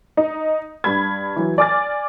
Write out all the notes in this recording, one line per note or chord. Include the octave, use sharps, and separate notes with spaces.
D#4
G2 B5 G#6
E3 F#3
D5 G#5 D6 F6 A6